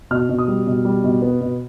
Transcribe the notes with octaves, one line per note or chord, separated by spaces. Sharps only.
B2 F6
B2
D#6
G3
B2
G3
B2
B3
B2